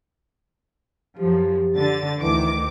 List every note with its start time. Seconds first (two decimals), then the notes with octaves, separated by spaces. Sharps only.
1.19 F#2 F3 G4
1.76 D3 A6
2.21 D2 D#3 E3 D6